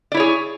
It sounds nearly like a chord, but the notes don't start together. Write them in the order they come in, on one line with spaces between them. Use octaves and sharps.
D5 E4 C#5 G#4